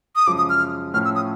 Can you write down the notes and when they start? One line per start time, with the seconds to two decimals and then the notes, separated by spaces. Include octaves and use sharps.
0.16 D#6
0.27 F#2 C#3 F3 G#3 D6
0.38 D#6
0.49 F6
0.94 A2 F3 A3 C#4 F6
1.05 E6
1.16 D#6